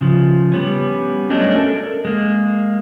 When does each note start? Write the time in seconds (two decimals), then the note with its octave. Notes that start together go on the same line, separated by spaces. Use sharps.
0.01 C#3 F3
0.52 G3 B3 C#4
1.30 F#3 A3 C#4 D4 C#5 D#5
1.56 A4 A#4
2.05 G#3 A#3